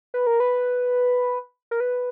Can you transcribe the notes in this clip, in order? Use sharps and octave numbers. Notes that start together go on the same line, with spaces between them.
B4
A#4
B4
A#4
B4